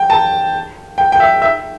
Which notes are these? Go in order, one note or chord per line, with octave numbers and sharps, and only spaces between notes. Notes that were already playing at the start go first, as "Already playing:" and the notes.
Already playing: G5
A5
G5
G5
E5
E5